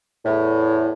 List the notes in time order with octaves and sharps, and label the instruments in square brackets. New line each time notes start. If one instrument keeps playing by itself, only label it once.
[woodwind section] E2 A2